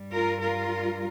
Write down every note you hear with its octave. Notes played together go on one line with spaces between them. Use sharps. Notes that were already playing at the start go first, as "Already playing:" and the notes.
Already playing: G2 G3
F4 A#4
F4 A#4